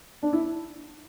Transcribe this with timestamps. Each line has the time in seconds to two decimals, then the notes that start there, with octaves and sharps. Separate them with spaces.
0.23 D4
0.33 E4